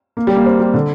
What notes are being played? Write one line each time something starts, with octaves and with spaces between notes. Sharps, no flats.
A#3
G3
A#3
C4
G3
D3